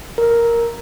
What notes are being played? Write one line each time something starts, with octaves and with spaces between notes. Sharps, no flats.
A#4